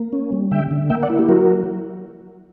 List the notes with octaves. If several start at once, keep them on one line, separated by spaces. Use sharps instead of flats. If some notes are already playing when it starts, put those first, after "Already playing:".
Already playing: A#3
C#4
G3
D3 E5 G5
D3
A#3 E5 G5
D5 F#5
E4
G4
F#3 F#4 A#4